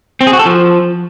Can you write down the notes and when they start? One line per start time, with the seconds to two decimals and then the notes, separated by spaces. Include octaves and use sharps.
0.21 C4
0.27 G#4
0.33 F#4
0.39 A4
0.46 F3